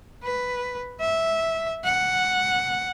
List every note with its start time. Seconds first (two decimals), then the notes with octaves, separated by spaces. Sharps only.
0.23 B4
1.01 E5
1.84 F#5